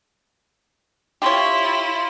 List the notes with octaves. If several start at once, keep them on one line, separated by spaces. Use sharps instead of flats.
E4 F4 G4 C#5 C6